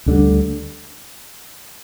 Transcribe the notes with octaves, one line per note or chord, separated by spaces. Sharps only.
D2 D3 G3